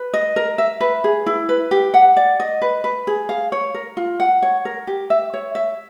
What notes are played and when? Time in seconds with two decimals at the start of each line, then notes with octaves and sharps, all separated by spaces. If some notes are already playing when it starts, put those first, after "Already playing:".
Already playing: B4
0.14 D#5
0.36 A#4
0.58 E5
0.80 B4
1.04 G#4
1.26 E4
1.49 B4
1.71 G4
1.94 F#5
2.16 D5
2.40 D#5
2.62 B4
2.84 B4
3.07 G#4
3.29 F5
3.52 C#5
3.74 A#4
3.97 F4
4.20 F#5
4.42 C#5
4.65 A#4
4.87 G4
5.10 E5
5.34 C#5
5.55 E5